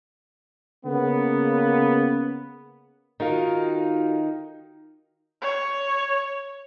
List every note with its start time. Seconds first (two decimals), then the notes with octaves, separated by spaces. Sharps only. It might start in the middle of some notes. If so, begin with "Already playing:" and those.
0.85 C#3 A#3 B3
3.20 D#3 D#4 F4 F#4 A4 F5
5.42 C#5